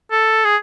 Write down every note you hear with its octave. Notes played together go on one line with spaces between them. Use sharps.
A4
G#4